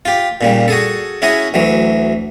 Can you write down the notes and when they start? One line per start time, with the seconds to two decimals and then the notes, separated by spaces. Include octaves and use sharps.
0.05 F4 G4
0.41 A#2 C#3 G3
0.68 F#4 G#4 A4
1.22 C#4 E4 F#4 G#4
1.54 D2 E3 F#3